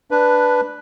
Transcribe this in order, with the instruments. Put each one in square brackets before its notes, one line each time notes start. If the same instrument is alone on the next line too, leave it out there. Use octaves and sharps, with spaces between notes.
[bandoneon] D4 B4